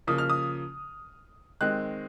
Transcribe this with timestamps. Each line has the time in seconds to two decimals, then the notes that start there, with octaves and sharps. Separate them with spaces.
0.07 C#3 F3 A#3 D#6
0.18 F6
0.30 D#6
1.61 D#3 G#3 C4 F#6